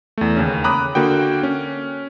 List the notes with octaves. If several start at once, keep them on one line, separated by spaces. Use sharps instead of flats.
E2 A3
D#2 C#3 C#4
A#5 B5 D6 D#6 F#6
D3 A#3 F#4 G5
C#4